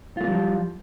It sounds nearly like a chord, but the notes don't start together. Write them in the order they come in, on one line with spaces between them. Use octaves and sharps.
F4 A3 A#3 G3 F3